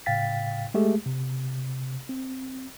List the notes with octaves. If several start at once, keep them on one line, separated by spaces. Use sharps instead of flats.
A2 C#3 F5 G5 A6 B6
G#3 A3 G4 G#4
C3
C4